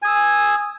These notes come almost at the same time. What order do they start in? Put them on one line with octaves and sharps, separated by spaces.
G#5 D#6 E6